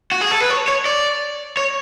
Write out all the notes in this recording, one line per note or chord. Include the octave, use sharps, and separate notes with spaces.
F#4
G#4
A4
B4
C#5
C#5
D5
C#5